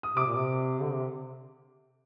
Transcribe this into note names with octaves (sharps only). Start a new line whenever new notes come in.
D#6
C3 D6
A#2
C3
D3
C3